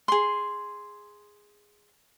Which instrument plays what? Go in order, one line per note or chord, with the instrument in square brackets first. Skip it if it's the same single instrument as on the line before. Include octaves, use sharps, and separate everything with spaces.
[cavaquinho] G#4 C6